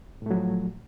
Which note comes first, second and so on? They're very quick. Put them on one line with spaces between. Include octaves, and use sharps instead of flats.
A2 A3 F#3 F3